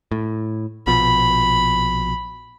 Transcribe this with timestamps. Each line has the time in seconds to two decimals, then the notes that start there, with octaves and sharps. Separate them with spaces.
0.11 A2
0.87 A#1 B2 F3 B5